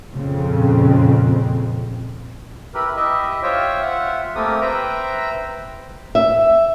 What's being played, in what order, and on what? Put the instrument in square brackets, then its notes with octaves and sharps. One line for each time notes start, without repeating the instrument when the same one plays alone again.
[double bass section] F2 A#2 C#3 C4
[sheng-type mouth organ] E4 G4 A#4 B4
E4 G4 D#5 E5
F4 C5 C#5 E5 G5
F4 E5 F#5
A3 A#3 C4 G4 A#4 D#6
B4 C5 E5 G5 A#5
[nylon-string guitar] E5